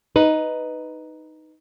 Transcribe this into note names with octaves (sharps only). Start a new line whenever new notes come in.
D#4 B4